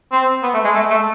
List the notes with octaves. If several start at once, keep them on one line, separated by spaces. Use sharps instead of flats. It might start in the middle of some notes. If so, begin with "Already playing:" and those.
C4
B3
A3
G#3
A3
A3